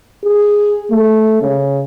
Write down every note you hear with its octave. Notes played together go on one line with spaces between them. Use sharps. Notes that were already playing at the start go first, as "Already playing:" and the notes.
G#4
A3
C#3